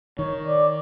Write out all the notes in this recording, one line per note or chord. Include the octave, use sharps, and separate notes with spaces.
D#3 C#5
D5